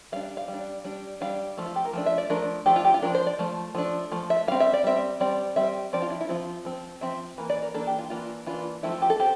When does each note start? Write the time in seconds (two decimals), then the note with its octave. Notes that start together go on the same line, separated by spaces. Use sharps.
0.12 G3 D4 F5
0.37 F5
0.48 G3
0.53 D4
0.84 G3 D4
1.20 G3 D4 F5
1.57 F3 A3
1.66 F4
1.76 G4
1.85 A#4
1.93 F3 A3 D4
2.06 E5
2.18 D5
2.30 F3 A3 D4 A#4
2.66 F3 A3 D4 G4
2.76 F4
2.85 G4
2.94 F4
3.02 F3 A3 D4 A#4
3.15 C5
3.27 D5
3.39 F3 A3
3.75 F3 A3 D4
4.11 F3 A3
4.30 E5
4.48 G3 C4 F5
4.60 E5
4.73 D5
4.84 G3 C4 E5
5.20 G3 C4 D5
5.56 G3 C4 E5
5.93 F3 C4 D5
6.02 F4
6.10 E4
6.21 E4
6.29 F3 C4 F4
6.65 F3 C4
7.01 F3 C4 E5
7.38 E3 A#3
7.50 D5
7.62 A#4
7.74 E3 A#3 D4 A4
7.87 G4
7.99 F4
8.10 E3 A#3 D4 F4
8.46 E3 A#3 D4 F4
8.83 F3 A3 C4 E4
8.92 F4
9.02 G4
9.10 A4
9.20 C4 G4